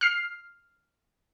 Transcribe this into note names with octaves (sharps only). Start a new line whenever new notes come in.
F6 C7